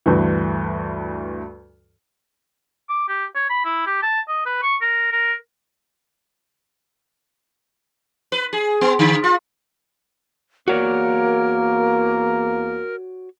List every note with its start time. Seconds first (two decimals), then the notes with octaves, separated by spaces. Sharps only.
0.06 D2 G2 E3
2.89 D6
3.09 G4
3.35 C#5
3.50 B5
3.65 E4
3.86 G4
4.03 A5
4.28 D#5
4.46 B4
4.62 C#6
4.81 A#4
5.12 A#4
8.32 B4
8.53 G#4
8.81 B3
8.99 D3
9.24 F4
10.68 E2 A#3 F#4 A#4 C#5 D5